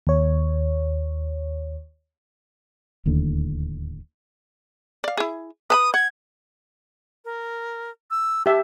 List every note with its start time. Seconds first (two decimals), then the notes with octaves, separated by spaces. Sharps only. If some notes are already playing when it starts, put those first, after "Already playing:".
0.07 D#2 C#5
3.06 D1 D#2 A2 D3
5.04 D5 F5
5.17 E4 G#4
5.70 B4 A5 B5 D#6
5.94 F#5 G#6
7.25 A#4
8.11 E6
8.46 G4 E5 A5